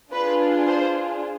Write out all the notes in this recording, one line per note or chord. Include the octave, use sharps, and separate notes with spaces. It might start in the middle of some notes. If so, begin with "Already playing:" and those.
D4 F4 G#4 B4
C5